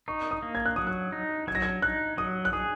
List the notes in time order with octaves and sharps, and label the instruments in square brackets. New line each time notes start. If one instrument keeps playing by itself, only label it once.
[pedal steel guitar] D#4 [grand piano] C#6
[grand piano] D#6
[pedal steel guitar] A#3
[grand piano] G#6
F#6
[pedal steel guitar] F#3 [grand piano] D#6
[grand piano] F#6
[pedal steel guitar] D#4
[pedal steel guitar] F#3 [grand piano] G#6
[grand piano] A#6
G#6
[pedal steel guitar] D#4 [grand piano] F#6
[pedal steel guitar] F#3 [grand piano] D#6
[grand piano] F#6
[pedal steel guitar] G#4 [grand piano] D#6